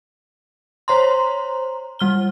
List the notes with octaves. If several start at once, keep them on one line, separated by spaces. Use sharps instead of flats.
C5 C#5 A#5 C6
G3 F6 G7